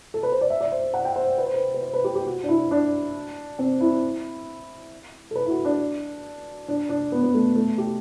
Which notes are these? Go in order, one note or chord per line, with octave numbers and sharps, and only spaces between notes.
A4
B4
C5
D5
E5
D5
C5
F#5
G5
C5
B4
C5
B4
B4
C5
B4
G4
G4
F#4
D4
E4
D4
C4
E4
A4
B4
E4
F#4
D4
D4
D4
B3
B3
A3
A3
G4